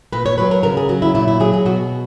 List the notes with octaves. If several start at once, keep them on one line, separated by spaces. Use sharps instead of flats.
A#2 B4
C#5
F#3 B4
A#4
C#3 A#4
G#4
F#3 F#4
E4
A#2 E4
E4
F#3 G#4
G#4
B2 F#4